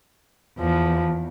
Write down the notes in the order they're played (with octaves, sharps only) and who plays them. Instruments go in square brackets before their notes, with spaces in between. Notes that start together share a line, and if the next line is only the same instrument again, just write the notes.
[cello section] E2 [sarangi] F3